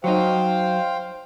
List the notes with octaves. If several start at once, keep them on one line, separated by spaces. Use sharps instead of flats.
F#3 D#4 C5 F5 G5